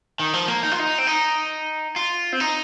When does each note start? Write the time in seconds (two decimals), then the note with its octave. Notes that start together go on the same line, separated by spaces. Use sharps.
0.20 D#3
0.33 F3
0.48 A#3
0.63 D#4
0.72 F4
0.79 D#4
0.98 C4
1.07 D#4
1.96 F4
2.33 C4
2.40 D#4